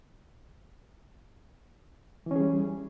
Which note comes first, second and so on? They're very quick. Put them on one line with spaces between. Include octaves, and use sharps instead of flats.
E3 C#4 G#4 G3